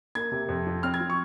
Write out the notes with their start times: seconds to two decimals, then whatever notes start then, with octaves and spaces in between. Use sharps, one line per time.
0.15 A#3 G#6
0.32 C3
0.49 F2
0.67 F3
0.83 C4 F6
0.94 G#6
1.00 F3
1.10 C#6